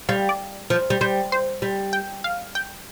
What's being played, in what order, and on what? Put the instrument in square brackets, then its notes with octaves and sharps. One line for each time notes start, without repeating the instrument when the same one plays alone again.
[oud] G3 [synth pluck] F5
[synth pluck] D5
[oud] F3
G3
[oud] G3 [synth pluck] C5
[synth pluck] C5
[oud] G3
[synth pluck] G5
F5
G5